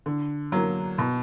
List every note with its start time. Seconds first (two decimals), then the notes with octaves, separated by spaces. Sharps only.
0.06 D3
0.52 F#3 A#3
0.98 B2